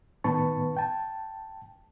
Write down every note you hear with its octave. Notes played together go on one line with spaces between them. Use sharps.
A2 D#3 B3 B4 A5 C#6
G5 A5